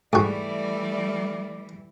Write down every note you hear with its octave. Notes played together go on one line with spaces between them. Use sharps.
G#2 E3 G3 A3 F#4 D5